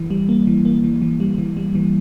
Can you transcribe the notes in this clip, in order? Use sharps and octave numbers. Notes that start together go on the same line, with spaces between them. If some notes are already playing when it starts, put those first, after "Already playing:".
Already playing: E3
G3
A#3
E3
A#3
E3
E3
G3
E3
G3
E3